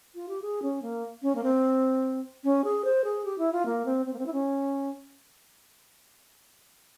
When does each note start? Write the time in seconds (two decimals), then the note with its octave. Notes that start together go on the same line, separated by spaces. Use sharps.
0.15 F4
0.29 G4
0.42 G#4
0.62 C#4
0.82 A#3
1.22 C#4
1.35 A#3
1.44 C4
2.44 C#4
2.64 G#4
2.85 C5
3.04 G#4
3.25 G4
3.38 E4
3.52 F4
3.66 A#3
3.86 C4
4.06 C4
4.13 A#3
4.19 C4
4.26 E4
4.33 C#4